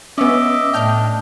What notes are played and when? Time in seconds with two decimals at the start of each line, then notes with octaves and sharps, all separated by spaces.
0.18 B3 C#4 D#5 E5 D6
0.73 A2 D4 G5 F6 G6